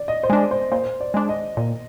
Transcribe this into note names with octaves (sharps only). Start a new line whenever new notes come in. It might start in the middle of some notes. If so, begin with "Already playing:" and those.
Already playing: D5
D#5
C5
G#3 D4 D5
C5
A#2 C5
D5
G#3 D4
D#5
A#2